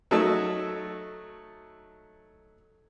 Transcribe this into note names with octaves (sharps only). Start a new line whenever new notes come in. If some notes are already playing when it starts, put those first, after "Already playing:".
F#3 A3 D#4 A5 E6